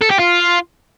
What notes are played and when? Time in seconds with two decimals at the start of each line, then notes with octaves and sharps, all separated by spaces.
0.02 A4
0.11 G4
0.19 F4